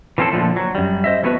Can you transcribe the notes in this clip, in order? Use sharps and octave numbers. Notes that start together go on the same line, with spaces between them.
E3 F3 C4 C#4 A4
A#2 D3 F3 A3
F#3
F#2 G3
C5 D#5 E5
E3 F#3 A3 B3 F#4 B4